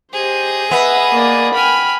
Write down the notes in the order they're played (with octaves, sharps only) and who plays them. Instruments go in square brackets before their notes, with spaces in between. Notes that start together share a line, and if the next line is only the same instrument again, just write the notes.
[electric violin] G4 C5 [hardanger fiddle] G#4 D#5
[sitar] B3 [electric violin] B4 E5
[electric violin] A#3 D5
[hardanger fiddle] G5 G#5 [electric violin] B5 F6